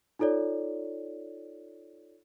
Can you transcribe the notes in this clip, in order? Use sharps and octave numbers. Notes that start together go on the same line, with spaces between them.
D#4 F4 A4 C#5 D5